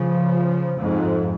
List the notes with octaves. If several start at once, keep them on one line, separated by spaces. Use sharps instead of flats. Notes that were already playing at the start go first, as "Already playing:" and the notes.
Already playing: C#3 F3
F2 G#2